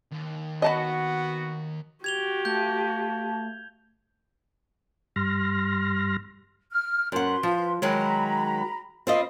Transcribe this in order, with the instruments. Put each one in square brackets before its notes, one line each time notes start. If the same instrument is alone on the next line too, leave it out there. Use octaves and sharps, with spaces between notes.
[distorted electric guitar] D#2
[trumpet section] B3 F#4 [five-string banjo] D#5 A5 B5
[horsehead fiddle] F#4 G4 [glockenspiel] G#6 F7 G7
[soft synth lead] A3 [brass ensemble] F5 A5 [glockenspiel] G6
[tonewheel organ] G2 G3 C6 F6 A#6
[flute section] F6
[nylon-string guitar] F#2 F#5 [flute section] B4 C6
[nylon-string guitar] F3
[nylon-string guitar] D#3 F#3 G#3 [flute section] A#5 B5
[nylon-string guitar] C4 F4 D#5 [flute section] F5 B5